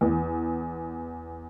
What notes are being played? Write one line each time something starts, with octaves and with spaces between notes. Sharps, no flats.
E2